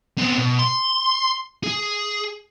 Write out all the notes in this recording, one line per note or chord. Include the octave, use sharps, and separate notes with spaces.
B3 C4
B2
C6
G#4